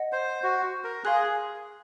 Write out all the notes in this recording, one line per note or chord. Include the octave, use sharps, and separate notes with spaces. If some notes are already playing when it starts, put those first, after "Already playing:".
Already playing: D#5 F#5
C5
F#4
A#4
G#4 F5 C6 D#6 F#6